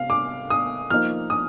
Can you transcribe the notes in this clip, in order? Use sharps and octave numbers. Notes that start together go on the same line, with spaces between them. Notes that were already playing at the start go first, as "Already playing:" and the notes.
Already playing: C3 F5
D6
D#6
F3 A#3 D#4 F6
D#6